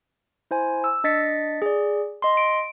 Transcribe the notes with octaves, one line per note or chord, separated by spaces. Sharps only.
E4 C5 G#5
E6
D4 D#5 A6 B6 C#7
G#4 D5
D#5 C6
D7